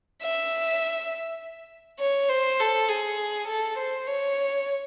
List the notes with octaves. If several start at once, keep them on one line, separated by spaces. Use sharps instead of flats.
E5
C#5
C5
A4
G#4
A4
C5
C#5